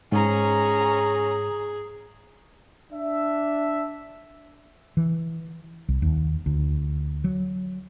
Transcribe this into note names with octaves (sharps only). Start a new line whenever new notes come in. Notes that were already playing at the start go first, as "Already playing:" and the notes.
G#2 C#4 G#4 A#5
D4 E5
E3
C2
D#2
D2
F#3